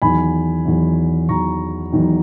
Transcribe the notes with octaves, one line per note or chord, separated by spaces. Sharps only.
E2 D#3 F#3 G#5 B5
E2 D#3 F#3
E2 D#3 F#3 A#5 C#6
E2 D#3 F#3